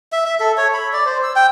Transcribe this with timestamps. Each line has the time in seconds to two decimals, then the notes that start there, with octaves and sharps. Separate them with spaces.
0.12 E5
0.26 E5
0.40 A4
0.58 C#5
0.74 B5
0.93 D5
1.06 C5
1.23 E6
1.36 G5